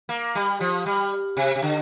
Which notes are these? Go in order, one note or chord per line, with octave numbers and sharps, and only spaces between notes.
A#3
G3
F3
G3
C3
C3
D3